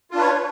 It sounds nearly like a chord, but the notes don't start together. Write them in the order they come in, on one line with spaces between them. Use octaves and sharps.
F4 D4 B4 C#5